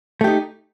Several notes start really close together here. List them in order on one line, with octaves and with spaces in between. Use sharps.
A3 G4 D#4